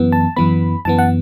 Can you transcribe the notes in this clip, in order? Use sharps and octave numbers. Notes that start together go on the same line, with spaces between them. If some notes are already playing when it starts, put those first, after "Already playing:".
Already playing: F#2 E3 B3
A5
F#2 E3 B3 B5
F#2 E3 B3 A5
F#5